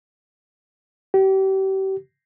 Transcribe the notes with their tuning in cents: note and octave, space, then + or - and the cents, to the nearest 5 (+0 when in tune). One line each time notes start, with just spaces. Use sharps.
G4 -35